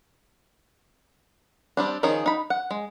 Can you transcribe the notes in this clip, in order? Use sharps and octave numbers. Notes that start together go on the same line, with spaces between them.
G3 C4 D4
D#3 F3 C#4 D#4 G#4
D#4 B5
F#5
G#3